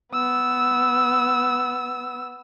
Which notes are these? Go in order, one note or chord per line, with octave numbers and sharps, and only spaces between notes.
B3 E6